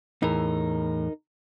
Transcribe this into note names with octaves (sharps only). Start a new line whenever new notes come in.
E2 A2 D#4 A#4